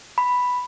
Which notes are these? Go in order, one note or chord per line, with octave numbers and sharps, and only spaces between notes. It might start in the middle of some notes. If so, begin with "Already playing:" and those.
B5